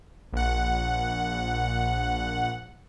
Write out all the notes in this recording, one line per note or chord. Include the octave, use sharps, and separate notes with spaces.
A#1 F#5